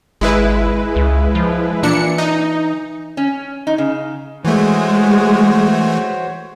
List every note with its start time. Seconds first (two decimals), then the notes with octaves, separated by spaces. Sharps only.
0.21 G#1 G#3 E4 B4
0.96 C#2
1.35 F3
1.83 A#2 E3 D4 C#7
2.18 D#4
3.17 C#4
3.67 D#4
3.78 C#3
4.45 E3 G#3 A3 F#4 C5 C#5